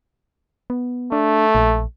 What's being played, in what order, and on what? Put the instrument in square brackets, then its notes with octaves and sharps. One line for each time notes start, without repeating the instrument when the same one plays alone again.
[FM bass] B3
[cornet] A3 [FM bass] D4
[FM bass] A#1